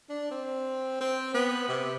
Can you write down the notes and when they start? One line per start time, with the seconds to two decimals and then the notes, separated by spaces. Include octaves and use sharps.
0.09 D4
0.31 C4
1.01 C4
1.34 B3
1.68 C3